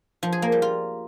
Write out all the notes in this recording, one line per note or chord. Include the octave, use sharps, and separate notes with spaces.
F3
G#4
A#3
G3
F4